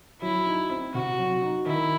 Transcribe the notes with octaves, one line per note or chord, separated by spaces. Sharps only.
F#3 E4
D#4
C4
C3 F#4
F#3
D#4
D#3 E4